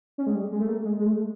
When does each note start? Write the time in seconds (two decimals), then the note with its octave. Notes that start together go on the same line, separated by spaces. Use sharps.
0.18 C#4
0.27 G#3
0.35 G3
0.52 G#3
0.60 A3
0.68 A#3
0.85 G#3
0.99 G#3
1.06 A3